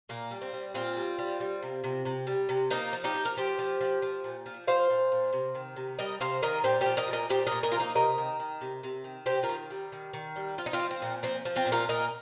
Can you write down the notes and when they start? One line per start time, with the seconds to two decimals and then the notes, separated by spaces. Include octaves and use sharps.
0.09 A#2 A#3
0.31 G3
0.42 C4
0.53 G3
0.74 A#2 C4 F4
0.97 G3
1.18 G3
1.40 G3
1.62 C3
1.84 C3
2.05 C3
2.27 G3
2.49 C3
2.71 F3 A#3 D#4
2.93 F3
3.04 D#4 G4
3.15 F3
3.25 A#4
3.37 F3 G4 C5
3.59 F3
3.81 F3
4.02 F3
4.24 A#2
4.46 F3
4.67 F3 C5 F5
4.90 A#2
5.12 A#2
5.33 C3
5.55 D#3
5.76 C3
5.99 G3 A#4 D#5
6.20 C3 C5 F5
6.43 D#3 A#4 D#5
6.64 A#2 G4 C5
6.81 F3 G4 C5
6.97 A#4 D#5
7.08 A#2
7.13 A#4 D#5
7.29 A#2 G4 C5
7.47 A#2 A#4 D#5
7.63 A#4 D#5
7.72 F3 F4
7.79 A#3 D#4
7.95 C3 A#4 D#5
8.18 D#3
8.40 D#3
8.61 C3
8.83 C3
9.04 D#3
9.26 C3 G4 C5
9.43 F4 A#4
9.49 D#3
9.70 G3
9.92 D#3
10.13 D#3
10.36 G3
10.58 F3 F4
10.66 D#4
10.73 C4 F4
10.79 F3
10.91 C4
11.02 A#2
11.23 F3 C4
11.45 F3
11.56 C4 F4
11.66 A#2
11.72 F4 A#4
11.89 A#2 A#4 D#5